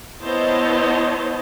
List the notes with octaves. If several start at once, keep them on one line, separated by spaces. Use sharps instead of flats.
B3 E4 C5 C#5 D#5 A5